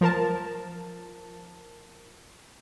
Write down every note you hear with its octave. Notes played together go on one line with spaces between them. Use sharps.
F3 A#4 A5